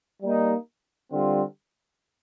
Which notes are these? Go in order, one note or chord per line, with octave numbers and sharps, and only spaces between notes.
G3 A#3 D#4
D3 G3 C4 F4